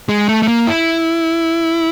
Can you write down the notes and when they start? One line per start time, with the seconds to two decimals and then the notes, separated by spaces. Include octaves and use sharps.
0.09 G#3
0.29 A3
0.43 A3
0.48 A#3
0.67 E4